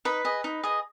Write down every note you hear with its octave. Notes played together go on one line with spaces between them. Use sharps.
D#4 B4 B5
G#4 D#5
D#4
G#4 D#5